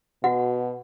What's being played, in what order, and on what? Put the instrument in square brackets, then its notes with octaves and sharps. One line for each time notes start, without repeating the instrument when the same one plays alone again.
[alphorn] B2 [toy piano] F#4 F#5